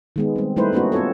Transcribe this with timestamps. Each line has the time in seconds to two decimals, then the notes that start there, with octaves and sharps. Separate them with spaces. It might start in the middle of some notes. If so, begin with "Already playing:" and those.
0.16 D#3 G#3 B3
0.36 G3 C4
0.56 G3 A3 D#4 E4 B4 C5
0.72 A#3 B3 C#4 D#4 F#4
0.92 B3 C4 F4 A4 C#5